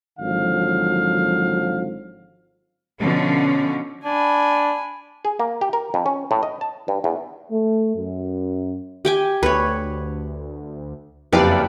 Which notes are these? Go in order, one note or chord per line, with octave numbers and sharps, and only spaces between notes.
G#1 D3 F3 F#3 F5
B2 D3 F3 C#4
D4 G#5 B5
G#4
A#3
G4
A#4
F2
C#4
A2
D#5
A5
G2
E2
A3
F#2
G4 G5 G#5
D2 B4 C#5
F#1 F2 E4 G4 B4 D5 F5